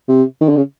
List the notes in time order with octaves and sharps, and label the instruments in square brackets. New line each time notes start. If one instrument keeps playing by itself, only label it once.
[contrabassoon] C3
D#3
D3
C#3